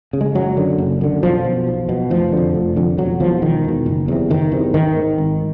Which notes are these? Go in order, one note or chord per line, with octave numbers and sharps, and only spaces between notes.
C#3
G#3
F#1 F#3
F#2 D3
F#1
F#2 D3
B1 F3
B2
B1
B2
F1 F3
F2 D3
F1
F2 D3
E1 F#3
E2 B2 F3
E1 D#3
E2 B2
F#1
E2 C3
F#1 D#3
E2 C3
G#1 D#3
G#2
G#1